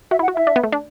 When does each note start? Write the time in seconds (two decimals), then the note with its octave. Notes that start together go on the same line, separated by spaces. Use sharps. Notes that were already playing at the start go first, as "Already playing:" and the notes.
0.11 F#4 E5
0.19 E4
0.23 F#5
0.28 F#4
0.34 E4 E5
0.47 D4
0.56 B3
0.63 A3
0.72 D4